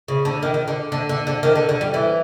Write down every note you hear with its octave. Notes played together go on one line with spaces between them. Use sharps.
C#3
D3
D#3
D#3
D3
D3
D3
D3
D#3
D3
D3
G3
E3